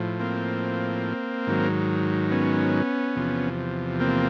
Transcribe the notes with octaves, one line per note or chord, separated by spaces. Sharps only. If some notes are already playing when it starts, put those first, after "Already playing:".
Already playing: A2 F3
A#3 C4
G#2 D#3 F#3
B3 C#4
E2 C3 F3
A#3 C4